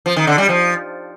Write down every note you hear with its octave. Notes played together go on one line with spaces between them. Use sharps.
F3
D#3
D3
G3
F3